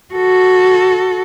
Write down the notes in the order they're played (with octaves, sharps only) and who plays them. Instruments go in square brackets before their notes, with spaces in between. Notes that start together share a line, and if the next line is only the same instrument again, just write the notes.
[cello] F#4 A4